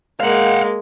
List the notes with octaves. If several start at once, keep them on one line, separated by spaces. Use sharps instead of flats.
G#3 A#3 F5 F#5